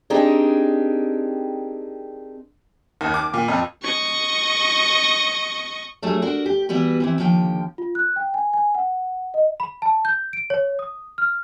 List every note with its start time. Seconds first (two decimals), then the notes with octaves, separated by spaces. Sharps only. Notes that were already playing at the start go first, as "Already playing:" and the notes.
0.10 C4 D4 D#4 G4 G#4 A#4
3.01 D#2
3.14 D6
3.34 A#2
3.48 F2
3.82 D#5 C#6
6.02 F#3 G3 A3 D4 G#4
6.22 D4 F#4 A#4
6.46 G4
6.69 E3 G3 B3 F#4 B4
7.00 E3 C4 E4
7.18 D#2 D3 F3 F5 G5
7.78 F4
7.95 F#6
8.16 G5
8.34 G#5
8.53 G#5
8.75 F#5
9.34 D#5
9.60 B5
9.82 A5
10.05 G6
10.33 D7
10.50 C#5
10.79 D#6
11.18 F6